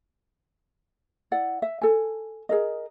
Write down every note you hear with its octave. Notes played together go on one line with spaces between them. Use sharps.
E4 D5 F#5
E5
A4 G#5
G#4 A#4 D#5